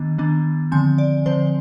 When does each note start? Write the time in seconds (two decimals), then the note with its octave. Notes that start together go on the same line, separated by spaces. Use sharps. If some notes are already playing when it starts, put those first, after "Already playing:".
Already playing: D#3 B3 D4
0.18 D#3 B3 D4
0.72 D3 F3 C4 G#5
0.98 D5
1.26 D3 F3 C4 C5